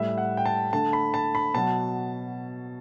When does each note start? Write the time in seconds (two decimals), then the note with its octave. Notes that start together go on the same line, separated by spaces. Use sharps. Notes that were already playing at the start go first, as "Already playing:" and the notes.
Already playing: A2 G3 E5
0.18 F#5
0.37 G5
0.46 A5
0.73 D3 A3 A5
0.93 B5
1.14 A5
1.35 B5
1.54 B2 F#3 A5